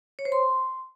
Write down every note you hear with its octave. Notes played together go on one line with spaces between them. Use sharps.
C#5
C5
C6